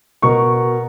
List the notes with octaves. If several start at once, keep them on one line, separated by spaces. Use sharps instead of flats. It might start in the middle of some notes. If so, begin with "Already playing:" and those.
B2 A#4 C#6